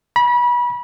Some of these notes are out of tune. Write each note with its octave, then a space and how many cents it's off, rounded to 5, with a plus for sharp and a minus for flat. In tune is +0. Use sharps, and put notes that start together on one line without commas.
B5 -30